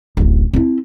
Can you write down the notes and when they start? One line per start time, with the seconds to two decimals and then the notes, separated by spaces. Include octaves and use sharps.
0.17 D1 A1
0.53 C4 E4